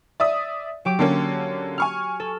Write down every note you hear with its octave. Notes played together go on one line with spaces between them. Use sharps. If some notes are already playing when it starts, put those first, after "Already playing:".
D5 E5 D#6
F#3 G4 D6
D3 A#3 C#4
G#5 C#6 F6
A4